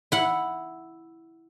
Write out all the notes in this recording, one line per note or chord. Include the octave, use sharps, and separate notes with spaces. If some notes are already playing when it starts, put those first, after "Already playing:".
E4 F#5